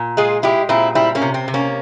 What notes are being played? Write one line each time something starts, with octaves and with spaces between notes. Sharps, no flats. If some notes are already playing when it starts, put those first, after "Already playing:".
Already playing: A#2
G#3 F4 G#4
G#3 E4 G4
A#2 C4 E4
G3 C4 E4
A#3 C#4
C3
C4
C3
A#3 C#4